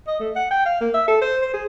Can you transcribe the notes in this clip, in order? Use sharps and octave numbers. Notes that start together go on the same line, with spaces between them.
D#5
A3
F#5
G5
F5
A#3
E5
A4
C5
C5
G#4